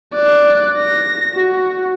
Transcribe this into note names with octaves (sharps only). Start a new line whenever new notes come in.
D5 F#6
A#6
F#4